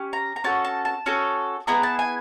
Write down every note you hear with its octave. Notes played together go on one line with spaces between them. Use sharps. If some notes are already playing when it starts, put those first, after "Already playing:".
Already playing: C#4 G4
A#5
A#5
C#4 F#4 A4 A5
A5
A5
C#4 F#4 A4
B3 E4 G#4 A#5
A5
G#5